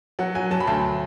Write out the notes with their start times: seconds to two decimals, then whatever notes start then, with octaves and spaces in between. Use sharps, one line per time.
0.19 F#3 F#5
0.35 F#3 G#5
0.51 F#3 A5
0.60 B5
0.67 D2 A5